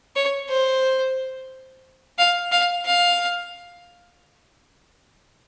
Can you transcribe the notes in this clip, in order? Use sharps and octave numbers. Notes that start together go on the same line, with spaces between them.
C#5
C5
F5
F5
F5